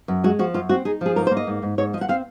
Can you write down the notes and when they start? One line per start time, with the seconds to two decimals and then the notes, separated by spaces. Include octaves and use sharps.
0.08 F#2
0.24 G#3 F#4
0.39 F3 F#4
0.54 F#2 F4
0.69 C4 F#4
0.85 D#4 G#4
1.01 F3 G#4
1.16 G#2 A#4
1.27 C5
1.31 A#3
1.37 D#5
1.47 G#2
1.62 G#2
1.78 G#2 C#5
1.93 F3 D#5
2.01 F#5
2.09 C4 F5